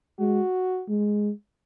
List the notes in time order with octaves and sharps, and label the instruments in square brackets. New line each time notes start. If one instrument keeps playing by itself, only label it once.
[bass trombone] G#3 [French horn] F#4
[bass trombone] G#3